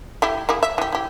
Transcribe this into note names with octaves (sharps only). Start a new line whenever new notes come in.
A3 E4 G4
A#3 E4 G#4
E5
E3 G4
E4 G4